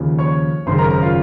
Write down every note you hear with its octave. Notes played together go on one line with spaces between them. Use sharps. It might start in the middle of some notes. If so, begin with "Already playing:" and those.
Already playing: D#2 C#3 F3
C#5 C#6
G#1 F#2 C#3 C5 C6
A#4 A#5
A#4 A#5
F4 F5